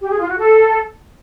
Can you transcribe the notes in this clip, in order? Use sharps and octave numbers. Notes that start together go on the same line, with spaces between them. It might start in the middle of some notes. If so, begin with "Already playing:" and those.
G4
G#4
F4
F#4
A4